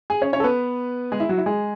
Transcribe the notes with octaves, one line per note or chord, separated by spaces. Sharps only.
G#4 G#5
C#4 C#5
C#4 C#5
A4
B3 B4
G#3 G#4
E4
F#3 F#4
E4
G#3 G#4